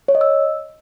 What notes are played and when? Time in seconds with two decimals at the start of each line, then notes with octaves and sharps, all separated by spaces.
0.08 C#5
0.15 D#5
0.21 E6